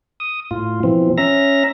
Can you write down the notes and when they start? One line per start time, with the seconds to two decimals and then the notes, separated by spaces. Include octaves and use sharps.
0.20 D#6
0.51 A2 F4
0.83 B2 E3 F3 C4
1.18 C#4 E5 A#5 A#6